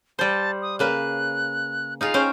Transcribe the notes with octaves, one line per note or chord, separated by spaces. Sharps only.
G3 C5 A5
D#6
C#3 A#3 B4 F#6
D#4 F4 G#4 F5
C#4 C5 G5